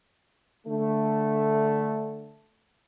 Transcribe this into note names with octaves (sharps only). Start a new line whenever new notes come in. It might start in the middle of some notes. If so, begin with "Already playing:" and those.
D3 A3